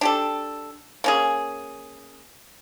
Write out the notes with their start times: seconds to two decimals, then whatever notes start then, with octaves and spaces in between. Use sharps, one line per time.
0.01 D4 G4 A4
1.04 A#3 C#4 G#4